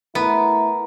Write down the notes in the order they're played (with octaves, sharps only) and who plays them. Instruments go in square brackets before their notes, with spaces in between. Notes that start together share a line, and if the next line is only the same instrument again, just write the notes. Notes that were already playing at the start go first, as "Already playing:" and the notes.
[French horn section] A3 E4 [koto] B3 [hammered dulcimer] A#4